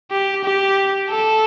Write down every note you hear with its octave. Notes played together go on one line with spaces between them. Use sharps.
G4
G4
A4